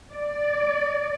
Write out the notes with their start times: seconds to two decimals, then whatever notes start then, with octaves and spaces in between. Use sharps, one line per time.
0.12 D5